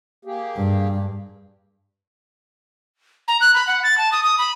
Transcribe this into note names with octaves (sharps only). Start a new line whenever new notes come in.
A#3 G4 G#4
G2
A#5
F#6
B5
F#5
A6
A5
D#6
D#6
B5